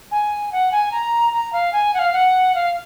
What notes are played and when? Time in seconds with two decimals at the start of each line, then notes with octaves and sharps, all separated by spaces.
0.11 G#5
0.52 F#5
0.72 G#5
0.91 A#5
1.33 A#5
1.53 F5
1.73 G#5
1.94 F#5
1.99 F5
2.13 F#5
2.54 F5